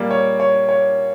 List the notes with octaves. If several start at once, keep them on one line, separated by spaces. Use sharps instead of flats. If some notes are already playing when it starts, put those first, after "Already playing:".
Already playing: A#2 G3 A#3 D5
C#5
C#5
C#5